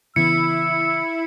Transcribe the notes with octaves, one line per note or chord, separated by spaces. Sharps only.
C#3 E3 B3 E4 E6 C#7